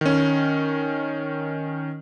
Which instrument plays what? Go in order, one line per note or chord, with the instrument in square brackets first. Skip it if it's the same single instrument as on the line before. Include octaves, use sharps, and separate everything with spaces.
[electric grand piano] D#3 C#4